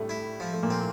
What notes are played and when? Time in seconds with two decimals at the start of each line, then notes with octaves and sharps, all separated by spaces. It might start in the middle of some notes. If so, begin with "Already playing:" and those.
Already playing: A2 G3 A3
0.09 E4
0.40 F3
0.53 A3
0.63 A#2 A#3
0.70 C4